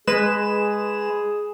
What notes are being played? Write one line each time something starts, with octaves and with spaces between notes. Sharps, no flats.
G#3 G#4 B4 E7